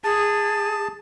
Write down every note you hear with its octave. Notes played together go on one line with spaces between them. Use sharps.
G#4 A5